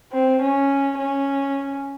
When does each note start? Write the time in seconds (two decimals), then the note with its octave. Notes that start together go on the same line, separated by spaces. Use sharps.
0.12 C4
0.42 C#4
0.98 C#4